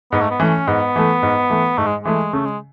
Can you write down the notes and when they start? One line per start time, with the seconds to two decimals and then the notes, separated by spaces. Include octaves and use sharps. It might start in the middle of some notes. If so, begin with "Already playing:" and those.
0.12 G#2 B3
0.21 A3
0.30 B3
0.40 E3 A3 C#4
0.67 G#2 B3
0.96 E3 A3
1.23 G#2
1.50 E3 A3
1.78 G#2 A3
1.86 G#3
2.03 E3 G#3 A3
2.33 C#3 A3
2.45 G#3